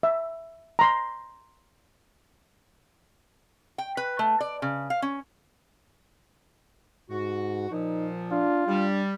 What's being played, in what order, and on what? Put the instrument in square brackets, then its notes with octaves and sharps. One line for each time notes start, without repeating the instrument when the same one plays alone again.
[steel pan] E5
A#5 C6
[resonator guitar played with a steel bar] G5
B4
A3
D5
C#3
F5
C#4
[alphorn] G#2 [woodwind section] F#4
[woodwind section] A#2 F3 [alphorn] D#4
[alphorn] D4 [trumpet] F4
[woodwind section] G3 [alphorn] D4